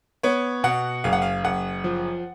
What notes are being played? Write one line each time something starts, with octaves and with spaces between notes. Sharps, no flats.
B3 C#5
B2 F#5
F#1 F5
F#5
F5
F#1 F#5
F3